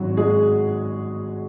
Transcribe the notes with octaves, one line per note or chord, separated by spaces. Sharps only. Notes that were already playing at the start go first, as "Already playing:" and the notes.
Already playing: G#1 G#2 F#3 F#4
G#3 G#4